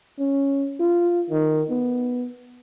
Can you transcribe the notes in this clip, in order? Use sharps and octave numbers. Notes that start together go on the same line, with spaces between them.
C#4
F4
D#3
B3